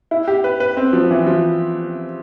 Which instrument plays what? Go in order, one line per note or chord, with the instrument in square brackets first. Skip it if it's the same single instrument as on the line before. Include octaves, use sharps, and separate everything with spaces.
[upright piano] E4
G4
B4
B4
C4
F3
E3
F3